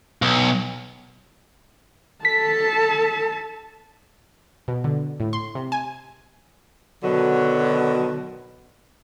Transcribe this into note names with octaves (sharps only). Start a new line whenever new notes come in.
B1
A4 A5 B6
B2
D3
A2
C6
C3
G#5
B2 D3 D#3 F#3